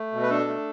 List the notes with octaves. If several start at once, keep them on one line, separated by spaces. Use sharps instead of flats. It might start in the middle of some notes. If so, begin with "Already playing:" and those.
Already playing: A3
B2
B4
D4 A4
A3